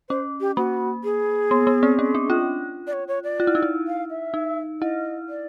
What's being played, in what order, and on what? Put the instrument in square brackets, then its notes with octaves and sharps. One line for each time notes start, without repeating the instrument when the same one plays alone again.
[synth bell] C#4 [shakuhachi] C5
[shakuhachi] G4
[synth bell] A#3 [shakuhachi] F#4
[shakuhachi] G#4
[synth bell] B3
B3
C4
C#4
D4
F4
[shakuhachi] D5
C#5
C#5
D5
[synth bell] F4
E4
D#4
E4
[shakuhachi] F5
E5
[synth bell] D#4
[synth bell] E4 [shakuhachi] D#5
[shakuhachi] D5